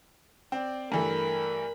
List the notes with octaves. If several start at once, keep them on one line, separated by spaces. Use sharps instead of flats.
C4 D5
G2 E3 A3 A#4 B5